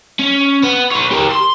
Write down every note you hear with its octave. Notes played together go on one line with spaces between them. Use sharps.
C#4
B3
B4 C#5
G4 A#4
C6